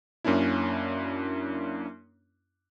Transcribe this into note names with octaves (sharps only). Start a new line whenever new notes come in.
F#2 A#3 C#4 D4 E4